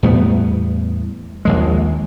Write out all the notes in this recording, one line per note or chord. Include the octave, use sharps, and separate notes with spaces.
E2 A2 G3 B3
A#1 D#2 G#3